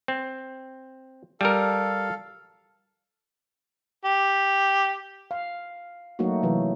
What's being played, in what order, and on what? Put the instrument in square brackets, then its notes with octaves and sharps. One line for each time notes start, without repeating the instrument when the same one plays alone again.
[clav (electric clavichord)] C4
[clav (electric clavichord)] G3 A#4 [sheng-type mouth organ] A4 F5
[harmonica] G4
[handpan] F5
F#3 A3 A#3 D#4 F#4
C3 E3 F#3